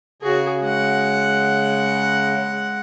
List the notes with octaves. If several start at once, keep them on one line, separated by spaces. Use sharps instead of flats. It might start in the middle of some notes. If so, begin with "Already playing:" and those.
C#3 F#4 G#4
G#3 F#5